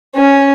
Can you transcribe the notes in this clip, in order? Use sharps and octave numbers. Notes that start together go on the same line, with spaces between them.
C#4